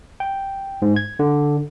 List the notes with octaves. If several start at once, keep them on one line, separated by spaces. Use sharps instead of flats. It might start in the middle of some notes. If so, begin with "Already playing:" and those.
G5
G#2
G#6
D3